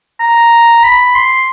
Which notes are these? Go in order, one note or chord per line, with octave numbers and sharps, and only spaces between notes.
A#5
B5
C6